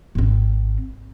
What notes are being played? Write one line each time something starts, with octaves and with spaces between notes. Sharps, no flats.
G#1 C4